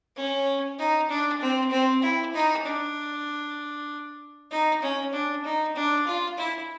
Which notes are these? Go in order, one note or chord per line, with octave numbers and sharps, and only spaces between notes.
C#4
D#4
D4
C4
C4
E4
D#4
D4
D#4
C#4
D4
D#4
D4
F4
E4